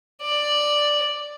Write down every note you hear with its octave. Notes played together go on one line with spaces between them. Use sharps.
D5